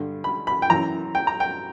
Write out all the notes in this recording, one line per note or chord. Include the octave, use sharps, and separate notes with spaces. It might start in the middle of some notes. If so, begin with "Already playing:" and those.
Already playing: G2 D3
B5
B5
G5
F#2 E3 A#5
G5
A#5
G5